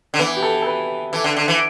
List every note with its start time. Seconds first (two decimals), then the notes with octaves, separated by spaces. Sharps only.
0.14 D3
0.19 E3 B3
0.37 G4
0.43 A4
0.62 A4
0.66 B4
1.13 E3 A4
1.24 D3
1.37 D3
1.48 E3